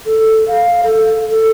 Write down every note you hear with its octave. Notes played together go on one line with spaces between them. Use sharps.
A4
F5
A4
A4